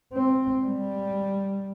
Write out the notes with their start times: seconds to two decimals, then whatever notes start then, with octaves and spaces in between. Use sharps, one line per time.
0.13 C4
0.65 G3